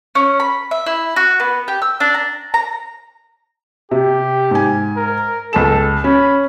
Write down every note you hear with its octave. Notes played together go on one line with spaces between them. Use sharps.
C#4
B5
E5
E4
F#4
B3
G4
E6
D4
A#5
A#5
C3 G4
G#2 G#5
A#4
C#2 A4 A5 E7
C#4 B5